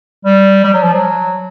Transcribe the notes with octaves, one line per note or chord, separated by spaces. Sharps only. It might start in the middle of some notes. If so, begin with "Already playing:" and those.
G3
G3
F#3
F3
F#3